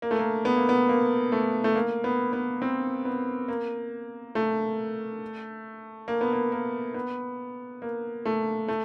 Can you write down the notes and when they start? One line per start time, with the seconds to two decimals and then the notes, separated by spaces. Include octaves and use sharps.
0.02 A#3
0.11 A3
0.19 A#3
0.45 B3
0.57 A#3
0.69 B3
0.89 A#3
1.32 A3
1.64 A3
1.75 A#3
2.04 B3
2.33 B3
2.62 C4
3.05 B3
3.48 A#3
4.35 A3
6.08 A#3
6.21 B3
6.33 A#3
6.52 A#3
6.94 B3
7.82 A#3
8.25 A3
8.68 A3